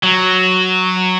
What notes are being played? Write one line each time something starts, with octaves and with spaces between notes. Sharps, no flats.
F#3